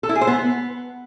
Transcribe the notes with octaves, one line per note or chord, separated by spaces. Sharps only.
A4
E4
G#4
C5
B3